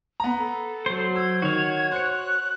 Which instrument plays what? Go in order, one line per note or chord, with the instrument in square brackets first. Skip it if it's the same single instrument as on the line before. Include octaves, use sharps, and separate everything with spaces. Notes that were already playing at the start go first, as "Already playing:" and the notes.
[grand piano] B3 A#5
[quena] A4
[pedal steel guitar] F#3 C5
[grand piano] E6 [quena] G#6
[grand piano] D#3 [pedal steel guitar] F#4 C#5
[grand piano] C5 C#7 [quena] F#6